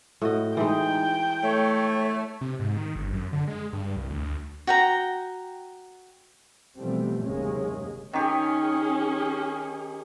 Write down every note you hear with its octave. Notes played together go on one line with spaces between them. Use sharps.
A2 F#4 D#5
E3 G#3 D#4 G5
A3 C#5
C3
G#2
D#3
G1
F#2
D3
G#3
G2
C2
D2
F#4 G5 A#5
B2 E3 F3 G3 A3 C4
F#1 D#2 C3 G#3 A#3 C#4
D#3 C#4 G4 G#4